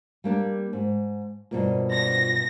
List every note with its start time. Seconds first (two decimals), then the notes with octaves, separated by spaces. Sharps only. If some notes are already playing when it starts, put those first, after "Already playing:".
0.24 G3 A#3 D4
0.73 G#2
1.51 G2 B2 A#3 F4 C5 D5
1.93 A#6